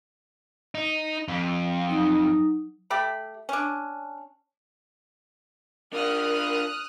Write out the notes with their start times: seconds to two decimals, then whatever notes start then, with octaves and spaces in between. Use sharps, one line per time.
0.75 D#4
1.28 F2
1.89 F#3 D#4 D#6
2.90 A3 G4 B5
3.49 C#4 D4
5.93 D4 F4 A#4 D#6 F6 F#6